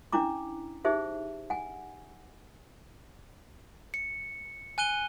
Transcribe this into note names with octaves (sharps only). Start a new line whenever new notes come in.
C#4 D4 E4 A#5 D6
D#4 G4 G#4 C5 E5
F#5 G#5
C#7
G#5 F#6 D#7 G7